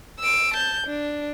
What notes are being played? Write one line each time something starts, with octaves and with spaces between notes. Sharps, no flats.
E6 D7
A5 G6
D4